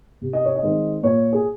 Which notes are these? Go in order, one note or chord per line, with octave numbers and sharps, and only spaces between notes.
C3
D#5
C#5
D#5
D#3 G#3 C4
A#2 C#5
G#4